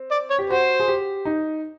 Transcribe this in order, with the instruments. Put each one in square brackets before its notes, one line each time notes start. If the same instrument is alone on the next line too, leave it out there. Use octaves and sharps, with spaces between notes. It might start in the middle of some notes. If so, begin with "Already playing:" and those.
Already playing: [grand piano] C4
[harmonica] D5
C#5
[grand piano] G4
[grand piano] F#4 [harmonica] C5
[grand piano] G#4
G4
D#4